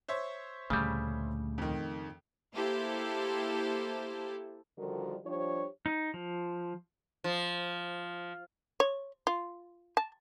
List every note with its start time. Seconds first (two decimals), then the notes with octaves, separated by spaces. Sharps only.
0.08 C5 C#5 E5
0.70 D2 A#2 C#3 G3 A3
1.58 F2 D#3
2.53 A#3 E4 G4 A4 C5
4.78 D3 D#3 F3 G3 F#4 A#4
5.24 F3 G3 D4 G4 C5 C#5
5.86 D#4
6.14 F3
7.24 F3
8.80 C#5
9.27 F4
9.97 A5